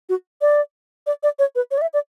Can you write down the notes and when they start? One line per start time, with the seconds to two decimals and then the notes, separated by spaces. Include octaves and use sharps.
0.09 F#4
0.41 D5
1.07 D5
1.23 D5
1.39 C#5
1.55 B4
1.71 C#5
1.78 D5
1.82 E5
1.94 D5